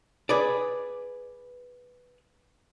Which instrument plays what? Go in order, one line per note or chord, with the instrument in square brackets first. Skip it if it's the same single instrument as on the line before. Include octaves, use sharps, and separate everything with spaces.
[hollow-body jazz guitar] G#4 B4 D5